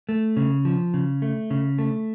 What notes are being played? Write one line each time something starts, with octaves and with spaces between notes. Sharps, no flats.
A3
C#3
F3
C#3
A3
C#3
A3